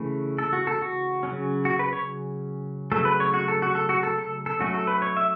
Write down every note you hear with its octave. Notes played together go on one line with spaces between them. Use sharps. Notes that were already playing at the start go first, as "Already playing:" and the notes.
Already playing: C#3 E3 A3 C#4
A4
F#4
A4
F#4
C#3 F#3 C#4
F#4
B4
C#5
C#3 F#3 A3 A4
B4
C#5
F#4
A4
F#4
A4
F#4
A4
A4
A4
F#3 A3 C#4 F#4
A4
B4
C#5
E5